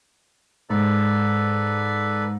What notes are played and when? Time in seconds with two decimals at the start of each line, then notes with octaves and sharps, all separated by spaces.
0.70 G#2 A4 B4 D5